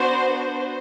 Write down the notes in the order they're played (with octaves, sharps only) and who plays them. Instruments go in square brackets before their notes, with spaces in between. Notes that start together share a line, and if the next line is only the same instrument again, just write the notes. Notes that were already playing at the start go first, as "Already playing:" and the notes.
Already playing: [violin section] B3 D4 F#4 C5